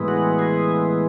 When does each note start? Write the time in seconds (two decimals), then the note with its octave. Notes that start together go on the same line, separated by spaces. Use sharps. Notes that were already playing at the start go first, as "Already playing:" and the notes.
Already playing: A2 E3 G#3 B3
0.08 F#4
0.39 G#4